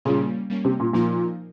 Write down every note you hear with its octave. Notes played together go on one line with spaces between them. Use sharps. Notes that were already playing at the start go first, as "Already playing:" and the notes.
A#2 C#3 G3 A#3 C#4
G3 A#3 C#4
C3
A#2
A#2 F3 A#3 D#4 A#4